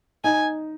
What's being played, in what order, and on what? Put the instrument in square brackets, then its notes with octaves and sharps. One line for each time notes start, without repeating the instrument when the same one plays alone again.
[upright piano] D#4 [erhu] G#5